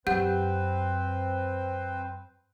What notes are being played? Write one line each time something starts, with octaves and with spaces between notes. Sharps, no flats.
F#2 C4 G4 B4 C5 F#5 G6